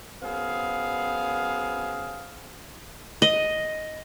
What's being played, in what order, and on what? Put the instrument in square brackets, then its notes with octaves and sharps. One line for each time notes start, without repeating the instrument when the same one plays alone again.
[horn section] F#2 B3 C4 G#4 F5
[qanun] D#5